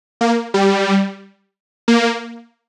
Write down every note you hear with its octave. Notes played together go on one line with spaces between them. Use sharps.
A#3
G3
A#3